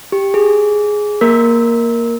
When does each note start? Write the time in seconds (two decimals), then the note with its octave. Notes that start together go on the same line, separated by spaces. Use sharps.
0.12 G4
0.34 G#4
1.21 A#3 A#4